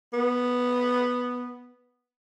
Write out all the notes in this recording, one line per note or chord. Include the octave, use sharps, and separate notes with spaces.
B3